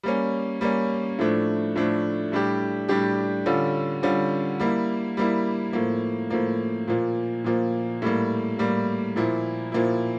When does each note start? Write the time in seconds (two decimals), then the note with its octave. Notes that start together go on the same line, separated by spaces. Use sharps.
0.03 G3 A#3 C#4
0.61 G3 A#3 C#4
1.19 A2 F3 A3 D4
1.76 A2 F3 A3 D4
2.32 A2 G3 D4 G4
2.89 A2 G3 D4 G4
3.46 D3 G3 C#4 F4
4.03 D3 G3 C#4 F4
4.60 G3 A#3 E4
5.17 G3 A#3 E4
5.73 A2 F3 A#3
6.30 A2 F3 A#3
6.88 A#2 F3 A#3
7.44 A#2 F3 A#3
8.02 A2 G3 A#3
8.58 A2 G3 A#3
9.16 A#2 F3 A#3 E4
9.72 A#2 F3 A#3 E4